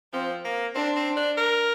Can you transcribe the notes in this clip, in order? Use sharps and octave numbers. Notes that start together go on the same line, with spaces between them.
F3 C4
A#3
C4 D4
C4
D4
A#4